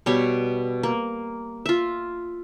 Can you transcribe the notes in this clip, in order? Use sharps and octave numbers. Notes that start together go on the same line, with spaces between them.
B2 G3 C#5
A#3
F4 E5